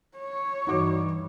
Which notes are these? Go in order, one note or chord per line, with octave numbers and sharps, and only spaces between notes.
C#5
G2 E3 D#4 F#4 D6